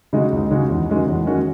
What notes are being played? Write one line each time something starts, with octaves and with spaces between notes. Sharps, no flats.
C#3 G#3 D#4 F#4
C#2
C#3 G#3 D#4 F#4
E2
D#3 G#3 C#4 F#4
E2
D#3 G#3 C#4 F#4